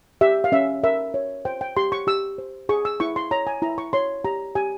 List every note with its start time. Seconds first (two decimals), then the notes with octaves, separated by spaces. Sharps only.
0.21 G4 E5
0.44 F5
0.52 C#4 E5
0.83 A#4 E5
1.14 C#5
1.45 C5 G5
1.61 G5
1.77 G4 C6
1.92 C#6
2.07 G4 E6
2.38 C5
2.69 G#4 C#6
2.85 E6
3.00 E4 C#6
3.16 C6
3.31 C#5 A#5
3.47 G#5
3.62 E4 A#5
3.78 C#6
3.93 C#5 C6
4.24 G4 A#5
4.55 G4 G#5